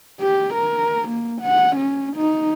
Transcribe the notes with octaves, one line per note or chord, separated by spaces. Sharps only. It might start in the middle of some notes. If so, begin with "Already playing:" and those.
G4
A#4
A#3
F#5
C#4
D#4